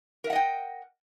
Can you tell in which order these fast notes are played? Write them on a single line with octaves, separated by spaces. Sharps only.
A#4 E5 F#5 D#5 G5